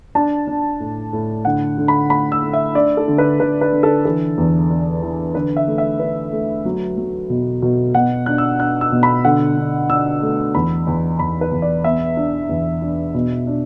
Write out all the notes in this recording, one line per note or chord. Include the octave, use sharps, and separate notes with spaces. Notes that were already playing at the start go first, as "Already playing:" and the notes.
D4 A5
D4
A2
A2
D3 F#5
D3
B5
A3 B5
E6
A3
E5
D4 D5
A4
D3
B4
D3 B4
B4
D3
A4
E3 A4
E2
D4
E3
D3 B4
E5
A3
E5
D4 B4
A3
F#3
F#3
B2
B2
B2 F#5
D4 F#6
E6
D4 F#6
E6
B2
B5
D3 F#5
D4
D4 E6
A3
E2 B5
E2
E2 B5
B4
E2
D5
B3 E5
D4
E2
D4
B2
D4